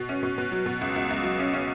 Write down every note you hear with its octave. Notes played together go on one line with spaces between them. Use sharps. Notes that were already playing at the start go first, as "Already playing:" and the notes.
Already playing: B2
C#4
B2
B2
F#3
B2
C#2
C#2
C#2
F#3
C#4
C#4